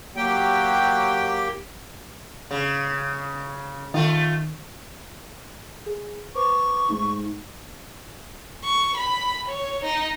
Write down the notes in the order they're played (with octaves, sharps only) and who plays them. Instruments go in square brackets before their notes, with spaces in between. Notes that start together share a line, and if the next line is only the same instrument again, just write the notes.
[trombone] F#3 [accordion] A#3 G4 G5
[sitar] C#3
[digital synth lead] D#3 [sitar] A3 F4
[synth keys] G#4
[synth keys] B4 C5 D6 [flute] C#6
[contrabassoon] G#2 [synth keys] A3
[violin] C#6
B5
C#5
D#4